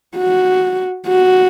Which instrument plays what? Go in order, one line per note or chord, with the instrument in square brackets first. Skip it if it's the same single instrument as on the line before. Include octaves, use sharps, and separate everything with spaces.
[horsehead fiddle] F#4
F#4